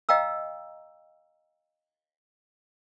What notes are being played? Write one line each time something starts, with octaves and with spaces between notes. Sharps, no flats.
D#5 F5 G5 A#5 E6